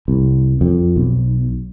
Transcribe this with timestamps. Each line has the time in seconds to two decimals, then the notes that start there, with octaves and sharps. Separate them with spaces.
0.08 C2
0.61 F2
0.96 B1